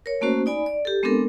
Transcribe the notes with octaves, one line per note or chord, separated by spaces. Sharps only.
A#4 C#5
A3 A#3 C#4 F#4 C5
D#4 D5 G#5 B5
D5
G4 A4
G#3 B3 C4 D4 A4 A#4